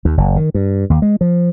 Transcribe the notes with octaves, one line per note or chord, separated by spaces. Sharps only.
D#2
F#1
D#3
G2
D#2
G#3
F3